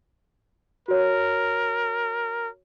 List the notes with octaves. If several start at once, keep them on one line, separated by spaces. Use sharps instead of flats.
F#4 A#4 C#5